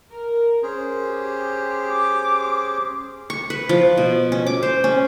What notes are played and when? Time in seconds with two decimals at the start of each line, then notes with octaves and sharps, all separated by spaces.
0.11 A#4
0.63 C#4 G#4 C5
1.02 G4
1.92 D6
3.30 C#6
3.50 B4
3.69 F3
3.98 B2
4.32 C#4
4.47 D6
4.63 C5
4.84 C#4